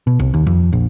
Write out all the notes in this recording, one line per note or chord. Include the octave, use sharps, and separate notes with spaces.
B2
C2
D#2
F2
A#1